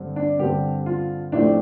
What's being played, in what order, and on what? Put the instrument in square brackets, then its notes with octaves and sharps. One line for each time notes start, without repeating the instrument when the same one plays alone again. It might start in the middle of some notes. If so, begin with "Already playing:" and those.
Already playing: [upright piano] G2 D3 G3 C4
D4
G2 D3 G3 C4 G4
F4
A1 A2 F3 A3 C4 D4